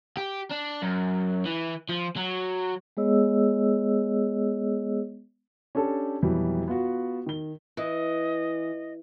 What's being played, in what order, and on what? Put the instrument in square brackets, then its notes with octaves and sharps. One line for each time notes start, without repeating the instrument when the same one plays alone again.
[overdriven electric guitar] G4
D4
F#2
E3
F3
F#3
[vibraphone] G#3 B3 G#4 C#5 D#5 E6
[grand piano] C#4 D4 G4 A4
F2 B2 E3 F#3 G3
B3 F4 F#4
D#3 G7
[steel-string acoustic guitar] E3 [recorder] D#5